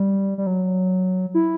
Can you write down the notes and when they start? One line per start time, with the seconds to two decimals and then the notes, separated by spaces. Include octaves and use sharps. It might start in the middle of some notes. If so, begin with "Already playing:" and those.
Already playing: G3
0.38 G3
0.47 F#3
1.34 E4